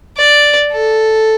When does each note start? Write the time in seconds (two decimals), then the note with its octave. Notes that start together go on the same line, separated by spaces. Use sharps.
0.17 D5
0.72 A4